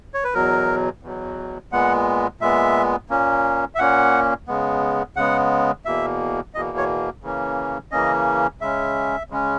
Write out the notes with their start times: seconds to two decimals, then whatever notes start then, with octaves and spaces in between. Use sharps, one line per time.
0.14 C#5
0.24 B4
0.34 E2 B2 F#3 A#4
1.03 E2 B2 F#3
1.72 A#2 G#3 B3 F#5
2.41 A#2 G#3 B3 E5
3.10 A#2 A#3 C#4
3.75 E5
3.79 A#2 A#3 C#4 F#5
4.48 C#3 G#3 B3
5.16 C#3 G#3 B3 F#5
5.85 E2 B2 A#3 E5
6.54 E2 B2 A#3 D#5
6.77 C#5
7.23 C#3 E3 A#3 C#4
7.91 C#3 E3 A#3 C#4 D#5
8.61 C#3 G#3 C#4 E5
9.30 C#3 G#3 C#4